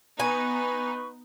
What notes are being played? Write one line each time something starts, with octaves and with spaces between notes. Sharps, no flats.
B3 D#4 B4 G#5 C#6